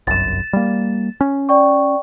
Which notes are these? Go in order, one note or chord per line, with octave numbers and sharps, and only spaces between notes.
G1 C2 F#2 A6 E7
G3 A#3
C#4
D5 G5 C#6